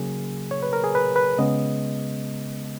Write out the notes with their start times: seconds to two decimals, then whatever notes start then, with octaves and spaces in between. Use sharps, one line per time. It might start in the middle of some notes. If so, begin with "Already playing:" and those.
Already playing: C#3 F#3 A#3 G#4
0.51 C#5
0.63 B4
0.73 A#4
0.84 G#4
0.95 B4
1.16 B4
1.39 C#3 G#3 B3 D#5